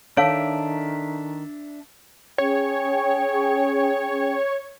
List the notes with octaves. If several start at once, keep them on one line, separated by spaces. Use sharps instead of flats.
D#3 D4 A4 C#5 E5 F5 A5 D7
C#4 G#4 C#5 G5